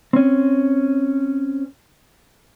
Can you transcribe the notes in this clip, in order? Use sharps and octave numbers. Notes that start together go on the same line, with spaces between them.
C4 C#4